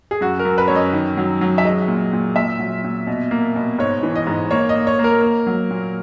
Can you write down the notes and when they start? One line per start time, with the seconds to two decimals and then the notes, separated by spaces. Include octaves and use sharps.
0.11 G#4
0.21 F#2 F#4
0.39 A#4
0.45 F#2
0.58 B4
0.68 F#2 C#5
0.75 D#5
0.93 D#3
1.17 F#3
1.41 F#3
1.58 E5
1.65 G#3 D#5
1.88 A#2
2.13 A#2
2.36 A#2 E5
2.60 F#3
2.84 A#2
3.07 B2
3.31 A#3
3.56 B2
3.79 G#2 C#5
4.03 E3
4.15 D#5
4.27 G#2
4.51 A#3 C#5
4.69 D#5
4.75 A#3
4.87 C#5
4.99 A#3
5.04 A#4
5.22 A#3
5.47 F#3
5.71 A#2